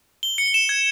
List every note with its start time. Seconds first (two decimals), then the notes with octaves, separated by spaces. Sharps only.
0.23 G7
0.38 C#7
0.54 E7
0.69 G#6